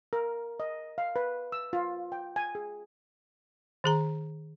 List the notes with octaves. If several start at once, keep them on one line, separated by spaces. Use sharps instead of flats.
A#4
D#5
F5
B4
E6
F4
G5
G#5
G#4
D#3 G#4 A#5